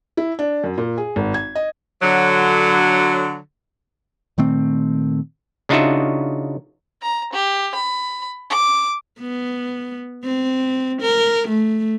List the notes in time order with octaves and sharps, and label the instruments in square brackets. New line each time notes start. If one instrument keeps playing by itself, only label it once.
[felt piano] E4
D4
F#2
A#2
G#4
G#1
G#6
D#5
[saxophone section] D3 F#3
[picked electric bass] A#2 D#3 A3 C4
[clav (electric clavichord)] C#3 D4 D#4 F4 F#4 E5
[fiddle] A#5
G4
B5
D6
[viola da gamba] B3
C4
A#4
A3